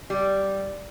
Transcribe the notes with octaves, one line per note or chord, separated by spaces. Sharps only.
G3